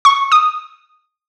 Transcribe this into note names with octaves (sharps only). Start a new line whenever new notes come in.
C#6
D#6